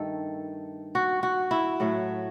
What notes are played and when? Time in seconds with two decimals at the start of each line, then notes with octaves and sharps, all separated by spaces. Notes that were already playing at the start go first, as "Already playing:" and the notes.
Already playing: G2 D#3 A3 A4
0.95 F#4
1.23 F#4
1.51 E4
1.80 A2 F#3 A3